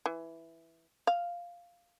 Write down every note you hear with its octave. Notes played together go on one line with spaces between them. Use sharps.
E3
F5